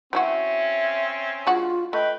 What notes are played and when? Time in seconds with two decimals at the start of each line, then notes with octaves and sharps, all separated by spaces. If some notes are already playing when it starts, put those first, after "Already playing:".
0.13 F#3 C4 C#4 E4 F#4 E5
1.47 G#3 D4 F4 F#4
1.93 A3 B4 D#5 G5